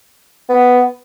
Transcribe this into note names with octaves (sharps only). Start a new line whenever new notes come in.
B3